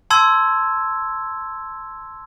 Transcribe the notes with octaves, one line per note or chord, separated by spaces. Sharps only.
A5 C6 E6 G#6